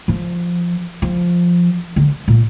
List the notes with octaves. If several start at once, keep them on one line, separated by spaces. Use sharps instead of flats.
F3
F3
D3
A#2